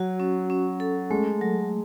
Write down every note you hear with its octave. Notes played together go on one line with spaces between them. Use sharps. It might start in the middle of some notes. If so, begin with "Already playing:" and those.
Already playing: F#3 F#4
C#4
C#4
A4
G#3 A3
F#3